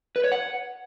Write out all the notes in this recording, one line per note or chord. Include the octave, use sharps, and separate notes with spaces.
B4
C#5
F#5